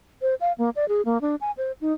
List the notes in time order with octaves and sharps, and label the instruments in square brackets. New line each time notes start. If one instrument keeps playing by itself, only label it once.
[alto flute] C5
F5
A#3
D5
G#4
A#3
D4
G#5
C5
D#4